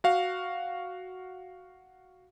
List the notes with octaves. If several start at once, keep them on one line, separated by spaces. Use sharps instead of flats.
F#4 F5